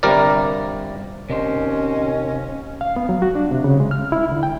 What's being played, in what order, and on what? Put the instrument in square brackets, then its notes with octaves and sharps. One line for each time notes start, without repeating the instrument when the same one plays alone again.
[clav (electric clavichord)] G1 C3 G3 A#4 D5
[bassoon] D#2 [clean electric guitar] C3 D4 C5 [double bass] C#4 [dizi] D#5
[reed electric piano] F5
B3
F#3
F#4
D4
C3
C#3
G#3
F6
E4
D3
G5